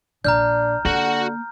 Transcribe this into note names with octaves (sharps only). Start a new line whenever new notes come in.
A#1 D4 A#5 F6 G6
D3 A#3 F#4 F#5